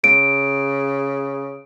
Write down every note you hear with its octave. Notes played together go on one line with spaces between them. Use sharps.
C#3 D7